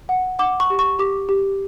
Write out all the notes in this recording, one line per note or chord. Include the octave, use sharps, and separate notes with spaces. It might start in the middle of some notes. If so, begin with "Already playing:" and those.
F#5
F#5 D6
C#6
G4
C#6
G4 D6
G4